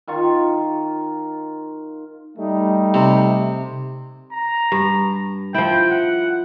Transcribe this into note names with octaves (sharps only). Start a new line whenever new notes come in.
D#3 F4 C#6
G3 A3 D#4
C3
A#5
G2
F3 E4 G5
F#5